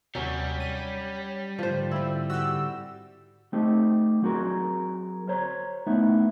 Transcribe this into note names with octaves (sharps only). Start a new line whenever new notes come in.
D#2 C3 F#3 G3 C#4 C#5
D#7
G#2 D3 F3 C5
C4 E4
F#4 G4 E6
A3 C4 D#4 G4
F#3 C4 F#4 G#4 A#4
A#4 C5 C#5 A#5
A3 B3 D#4 E4